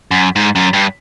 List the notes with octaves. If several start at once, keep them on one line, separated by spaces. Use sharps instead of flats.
F#2
G#2
F#2
G2